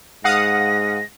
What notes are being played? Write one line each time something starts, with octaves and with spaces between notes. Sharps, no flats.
G#2 F5 F#5 D#6 A#6